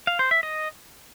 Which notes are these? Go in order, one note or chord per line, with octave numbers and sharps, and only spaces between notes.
F5
C5
E5
D#5